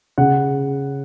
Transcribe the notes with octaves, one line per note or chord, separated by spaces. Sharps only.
C#3 F#5